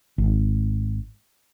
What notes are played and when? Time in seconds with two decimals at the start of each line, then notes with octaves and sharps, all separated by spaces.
0.18 G#1